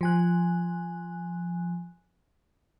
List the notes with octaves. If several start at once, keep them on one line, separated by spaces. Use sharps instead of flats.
F3 G#5 F#6